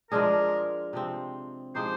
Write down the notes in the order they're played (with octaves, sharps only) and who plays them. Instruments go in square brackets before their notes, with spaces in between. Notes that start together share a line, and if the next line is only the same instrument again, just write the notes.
[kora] F3 G#3 D4 G#4 [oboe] A#4
[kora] C3 F3 C4
[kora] F3 G#3 D#4 G4 [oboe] C5